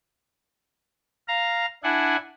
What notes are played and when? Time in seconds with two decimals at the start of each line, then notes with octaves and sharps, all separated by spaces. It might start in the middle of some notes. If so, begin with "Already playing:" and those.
1.28 F5 A#5
1.84 D4 E4 F#5 G#5